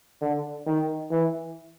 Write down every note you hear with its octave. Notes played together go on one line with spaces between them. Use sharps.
D3
D#3
E3